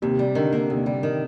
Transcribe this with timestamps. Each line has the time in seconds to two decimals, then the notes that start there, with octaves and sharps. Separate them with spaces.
0.02 D#2 C3
0.19 G3
0.35 D3 D#3
0.53 A#3
0.69 D#2 C3
0.86 G3
1.03 D#3